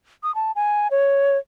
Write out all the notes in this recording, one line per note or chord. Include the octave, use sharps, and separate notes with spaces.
D#6
A5
G#5
C#5